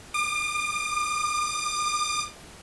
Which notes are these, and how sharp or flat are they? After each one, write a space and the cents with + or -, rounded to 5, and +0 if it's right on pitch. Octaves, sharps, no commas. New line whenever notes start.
D6 +45